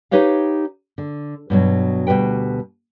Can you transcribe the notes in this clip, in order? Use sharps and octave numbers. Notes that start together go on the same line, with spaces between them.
D#4 G4 B4 C#5 F5
D3
G2 B2 F#3
D2 B2 G3 B4 G5